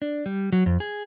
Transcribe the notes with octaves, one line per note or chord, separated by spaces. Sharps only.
D4
G3
F#3
F2
G#4